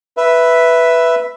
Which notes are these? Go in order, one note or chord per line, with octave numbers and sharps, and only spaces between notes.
B4 E5